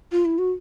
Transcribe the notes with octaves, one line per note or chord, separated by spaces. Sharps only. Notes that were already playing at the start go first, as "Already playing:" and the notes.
F4
E4
F#4